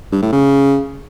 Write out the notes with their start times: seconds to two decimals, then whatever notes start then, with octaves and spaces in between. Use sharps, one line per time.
0.12 G2
0.22 A2
0.32 C#3